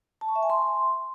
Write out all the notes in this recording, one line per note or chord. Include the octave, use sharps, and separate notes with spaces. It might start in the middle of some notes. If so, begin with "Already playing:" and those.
A5
C#6
E5
G#5
C6